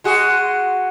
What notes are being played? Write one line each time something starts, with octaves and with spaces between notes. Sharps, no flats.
G#3 F#4 G#4